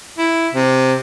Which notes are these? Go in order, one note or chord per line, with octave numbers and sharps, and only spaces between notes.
E4
C3